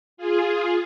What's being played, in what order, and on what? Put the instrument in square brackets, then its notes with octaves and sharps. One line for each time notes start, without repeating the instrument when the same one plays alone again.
[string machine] F4 G#4